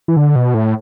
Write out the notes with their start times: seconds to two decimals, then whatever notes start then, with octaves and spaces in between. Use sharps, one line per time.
0.08 E3
0.17 D3
0.36 B2
0.54 A2